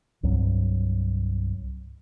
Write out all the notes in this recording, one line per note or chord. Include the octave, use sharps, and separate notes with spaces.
C2 G2 F#3